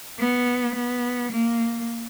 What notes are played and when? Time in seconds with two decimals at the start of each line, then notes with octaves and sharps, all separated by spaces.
0.19 B3
0.75 B3
1.32 A#3